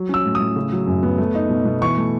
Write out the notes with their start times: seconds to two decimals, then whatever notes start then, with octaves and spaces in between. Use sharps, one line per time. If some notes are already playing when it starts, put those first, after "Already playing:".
Already playing: F#3
0.09 C#4 E6
0.25 A2
0.35 D#6
0.40 A2
0.56 C#3
0.72 F#3
0.87 F#2
1.03 B3
1.18 A3
1.35 D#4
1.50 B2
1.65 B2
1.81 E3 C#6
1.97 A3